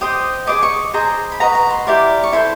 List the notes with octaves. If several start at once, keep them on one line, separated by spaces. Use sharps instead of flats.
G4 C5 D#5 D#6
G#4 C5 D#5 D6
C#6
G#4 C5 D#5 A#5
B5
F#4 B4 D#5 A#5
A#5
C6
E4 G4 A#4 D5
C#6
E4 A4 C5 C6